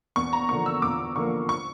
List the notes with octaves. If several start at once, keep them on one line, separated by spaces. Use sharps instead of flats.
E2 C#6
A#5
D3 F3 A#3 C#6
E6
E2 D6
D3 F3 A#3 C#6
C#6